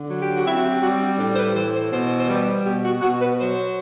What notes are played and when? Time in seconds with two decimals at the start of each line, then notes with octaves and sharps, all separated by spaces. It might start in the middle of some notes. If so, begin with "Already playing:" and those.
Already playing: D3
0.09 F#3
0.22 G4
0.34 F#4
0.45 C4 E4
0.57 F#4
0.64 G4
0.82 G3 F#4
1.00 D4
1.18 A2 D4
1.32 C5
1.37 B4
1.55 E3 C5
1.74 C5
1.92 B2 C5
2.18 C5
2.28 G3 B4
2.65 B2 G4
2.84 F#4
3.01 B2 F#4
3.19 B4
3.38 F#3 C5